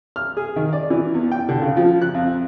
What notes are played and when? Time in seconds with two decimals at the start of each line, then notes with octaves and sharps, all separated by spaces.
0.16 F6
0.37 G#4
0.56 D#3
0.73 D5
0.90 E3
1.14 E2
1.32 G5
1.49 D3
1.62 C#3
1.77 F3
2.02 F#6
2.14 F2